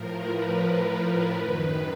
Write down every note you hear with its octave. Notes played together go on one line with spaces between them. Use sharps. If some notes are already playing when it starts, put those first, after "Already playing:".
Already playing: A2 F3 A#4
B4
F#2 D#3